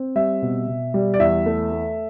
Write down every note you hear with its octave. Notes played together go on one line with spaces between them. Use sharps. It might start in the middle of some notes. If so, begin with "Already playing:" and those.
Already playing: C4
G3 E5
B2
B2
G3
D5
E2 E5
A3
A3